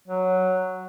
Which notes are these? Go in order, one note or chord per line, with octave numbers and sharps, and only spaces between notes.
F#3